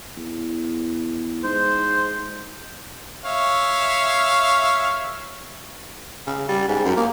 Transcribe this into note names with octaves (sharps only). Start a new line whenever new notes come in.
E2
G#2 C5
C#5 E5 F5
C#3
G3
G#2
F#2
A#3